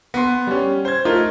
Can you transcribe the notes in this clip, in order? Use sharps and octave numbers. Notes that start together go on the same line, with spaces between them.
B3 C6
G3 C#4
C5 G#6
A3 D#4 F4 A#4